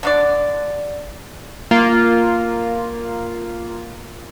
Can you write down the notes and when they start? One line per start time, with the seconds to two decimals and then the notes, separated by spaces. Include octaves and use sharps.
0.03 D3 D4 D5
1.71 A#3 F4